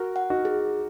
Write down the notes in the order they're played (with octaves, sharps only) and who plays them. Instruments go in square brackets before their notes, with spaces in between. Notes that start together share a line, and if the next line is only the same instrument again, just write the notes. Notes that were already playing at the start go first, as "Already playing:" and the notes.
Already playing: [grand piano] F#4 A#4
[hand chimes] F#5
[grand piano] D#4 F#4
[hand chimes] G#4